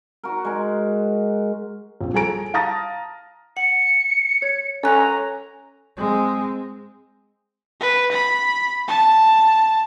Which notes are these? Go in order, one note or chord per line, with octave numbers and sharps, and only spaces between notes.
F#4 A#4
G#3 A#4
A#1 C4
G3 G#4 A4 G#5 A#5 D7
F5 A5 A#5 D#6 A6 A#6
F#5 C#7
C#5 G#6
C#4 A4 A#5 F#6
G#3 C4
B4
B5
A5